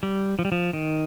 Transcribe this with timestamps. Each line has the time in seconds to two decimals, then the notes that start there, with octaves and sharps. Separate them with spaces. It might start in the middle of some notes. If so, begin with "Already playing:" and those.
0.03 G3
0.39 F3
0.45 G3
0.52 F3
0.73 D#3